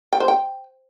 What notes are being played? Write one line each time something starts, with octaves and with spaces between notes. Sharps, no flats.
G5
C5
G5